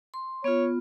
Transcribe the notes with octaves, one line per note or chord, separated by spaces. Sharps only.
C6
B3 F4 C#5